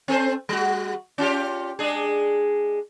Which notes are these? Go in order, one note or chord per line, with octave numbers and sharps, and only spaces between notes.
C4 A4 C5
G3 F#4
C#4 F4 G4
G#3 D4 G#4